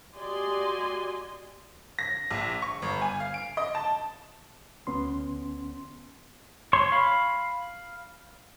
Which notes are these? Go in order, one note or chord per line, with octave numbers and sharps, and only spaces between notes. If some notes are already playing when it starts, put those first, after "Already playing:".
F#4 G4 D5 D#5 G#5 C6
A#6
A#1
C#6
G1
G#5
F5
D7
D#5
A5
D2 B3 C#4 C6
C#5 C6 C#6
F5 B5